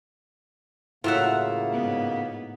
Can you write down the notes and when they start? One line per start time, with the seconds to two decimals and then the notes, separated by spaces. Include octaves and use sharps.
1.04 A2 C#3 F#3 A#3 F4 E5 F#5
1.73 G#2 B3